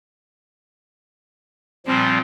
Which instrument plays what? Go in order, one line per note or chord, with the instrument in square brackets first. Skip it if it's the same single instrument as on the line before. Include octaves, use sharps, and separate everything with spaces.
[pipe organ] A#2 F3 G3 [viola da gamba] C4